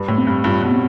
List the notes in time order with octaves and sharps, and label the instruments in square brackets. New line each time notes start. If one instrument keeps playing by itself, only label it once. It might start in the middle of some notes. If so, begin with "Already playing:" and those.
Already playing: [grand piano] G2 [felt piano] B4
[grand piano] A2
[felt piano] C4
[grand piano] G2
[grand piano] G2 [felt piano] F4
[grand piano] G2 B2
[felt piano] C4